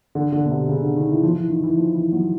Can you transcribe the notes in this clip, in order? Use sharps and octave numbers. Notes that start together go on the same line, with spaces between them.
D3
D3
B2
C3
C#3
D3
D#3
E3
F3
E3
D#3
E3
F3
E3
F#3